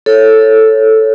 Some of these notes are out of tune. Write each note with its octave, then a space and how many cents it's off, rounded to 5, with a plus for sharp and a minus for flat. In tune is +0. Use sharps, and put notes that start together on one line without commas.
A4 +0 C#5 -5